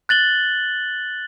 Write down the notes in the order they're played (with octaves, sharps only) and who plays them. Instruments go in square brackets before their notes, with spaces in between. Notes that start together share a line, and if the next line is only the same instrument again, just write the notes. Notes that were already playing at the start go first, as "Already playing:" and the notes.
[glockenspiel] F#6 A6 F#7 G7